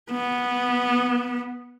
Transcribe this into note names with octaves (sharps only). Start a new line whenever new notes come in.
B3